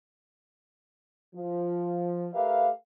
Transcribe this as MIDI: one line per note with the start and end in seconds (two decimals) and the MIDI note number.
1.36 2.28 53
2.34 2.69 57
2.34 2.69 67
2.34 2.69 70
2.34 2.69 71
2.34 2.69 76
2.34 2.69 77